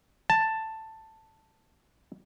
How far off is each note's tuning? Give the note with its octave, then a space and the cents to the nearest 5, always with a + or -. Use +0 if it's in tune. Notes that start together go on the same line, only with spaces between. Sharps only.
A5 +10